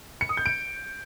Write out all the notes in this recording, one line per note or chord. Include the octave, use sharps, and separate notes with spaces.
C#7
D#6
G6
D7